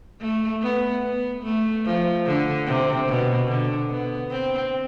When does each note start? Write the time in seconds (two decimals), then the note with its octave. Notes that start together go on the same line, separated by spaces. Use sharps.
0.21 A3
0.62 B3
1.04 B3
1.44 A3
1.85 F3
2.26 D3
2.67 C3
3.08 B2
3.49 D3
3.90 B3
4.31 C4